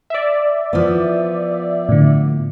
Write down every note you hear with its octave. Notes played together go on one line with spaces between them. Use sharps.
D5 E5
F3 B3
A2 D3